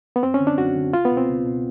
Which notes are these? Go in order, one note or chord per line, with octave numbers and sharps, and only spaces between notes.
B3
F#2 C4
C#4
D3
D4
F#2 F#4
D3
C#2 F4
B3
B2
C4
C#2
B2